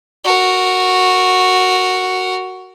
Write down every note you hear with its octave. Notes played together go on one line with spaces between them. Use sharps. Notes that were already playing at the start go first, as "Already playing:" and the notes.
F#4 A#4